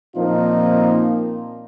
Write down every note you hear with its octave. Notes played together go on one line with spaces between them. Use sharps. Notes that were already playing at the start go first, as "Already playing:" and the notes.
A#2 F3 A#3 C4 D#4 F4